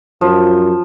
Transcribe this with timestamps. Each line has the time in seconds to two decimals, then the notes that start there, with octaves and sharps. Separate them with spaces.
0.21 F#2 F3